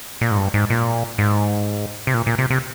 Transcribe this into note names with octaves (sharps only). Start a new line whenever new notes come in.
A#2
G#2
G2
G#2
A#2
G#2
C3
A#2
A#2
C3
C3